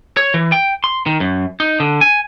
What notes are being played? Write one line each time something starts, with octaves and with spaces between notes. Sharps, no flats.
C#5
E3
G5
C6
D#3
F#2
D#4
D3
G#5